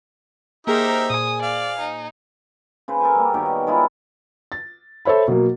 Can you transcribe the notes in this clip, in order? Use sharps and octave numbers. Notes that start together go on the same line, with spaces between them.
A#3 D#4 G4 G#4 A#4 C5 E5
A#2 G#5 D#6
D5 F5
D#4
C#3 B4 C5
A4 A#4 C5 G#5
G3 A#3
B2 D#3 G4 C#5
D#5
D#3 G#3 E4 F4
A6
A4 C5 C#5 E5 B5
B2 F#3 A#3